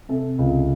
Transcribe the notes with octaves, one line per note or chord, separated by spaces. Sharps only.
C3 A4
C#2